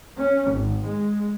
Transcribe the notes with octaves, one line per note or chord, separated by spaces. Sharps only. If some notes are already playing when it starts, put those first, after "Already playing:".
C#4
G#1
G#3